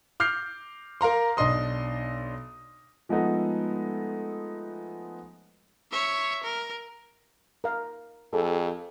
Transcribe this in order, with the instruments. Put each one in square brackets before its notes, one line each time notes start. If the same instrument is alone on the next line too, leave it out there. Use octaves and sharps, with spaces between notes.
[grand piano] D6 F6 G6 C7
A#4 F5 A#5 C6
B1 D4 D#5 C6 D#6
F3 G#3 A3 B3 D#4 A4
[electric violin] C#5 E5
A#4
[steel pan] A#4 F5
[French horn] F2 [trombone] G#4 [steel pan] A4